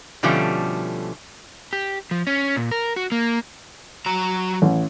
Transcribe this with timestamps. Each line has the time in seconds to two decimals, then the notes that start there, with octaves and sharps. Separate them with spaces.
0.23 B2 D3 F3 G3 A3 C#4
1.73 G4
2.11 F3
2.27 C#4
2.56 A#2
2.71 A#4
2.96 F#4
3.12 A#3
4.06 F#3 A#5
4.62 A1